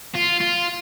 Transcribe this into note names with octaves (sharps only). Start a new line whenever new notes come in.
F4
F4